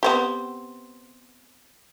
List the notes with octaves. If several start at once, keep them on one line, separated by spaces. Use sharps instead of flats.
B3 C4 G4